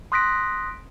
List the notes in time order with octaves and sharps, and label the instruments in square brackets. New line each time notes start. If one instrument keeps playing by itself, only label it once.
[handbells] C6 D#6 F#6 A#6 B6 D7